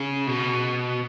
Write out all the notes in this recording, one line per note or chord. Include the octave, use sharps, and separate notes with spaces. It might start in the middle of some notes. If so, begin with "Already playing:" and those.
Already playing: C#3
B2